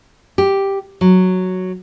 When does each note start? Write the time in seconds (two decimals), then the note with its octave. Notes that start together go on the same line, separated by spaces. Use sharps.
0.38 G4
1.01 F#3